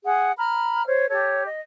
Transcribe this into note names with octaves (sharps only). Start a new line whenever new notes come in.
G#4 F#5
A#5 B5 F6
C5 C#5
G4 A4 C#5
D#5